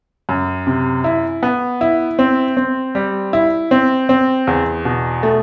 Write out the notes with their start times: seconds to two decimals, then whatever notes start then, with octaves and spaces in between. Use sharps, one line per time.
0.29 F#2
0.67 C3
1.04 E4
1.43 B3
1.81 E4
2.19 C4
2.57 C4
2.95 G3
3.33 E4
3.71 C4
4.09 C4
4.47 E2
4.85 B2
5.23 A3